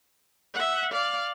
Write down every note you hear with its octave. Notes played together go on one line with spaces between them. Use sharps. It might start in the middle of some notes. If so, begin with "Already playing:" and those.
E5 F#5
D5 F5